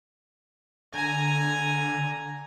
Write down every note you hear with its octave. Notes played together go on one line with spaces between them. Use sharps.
D3 G#5 A#5